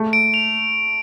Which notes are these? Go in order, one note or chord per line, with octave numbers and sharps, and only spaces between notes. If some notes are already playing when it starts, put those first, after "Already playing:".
Already playing: A3
D7
F7